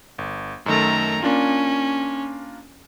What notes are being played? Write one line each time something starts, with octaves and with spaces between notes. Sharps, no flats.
G1
F#2 D#3 A3 A4 A#5
A#3 C#4 D4 F4